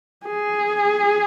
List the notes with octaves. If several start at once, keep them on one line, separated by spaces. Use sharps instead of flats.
G#4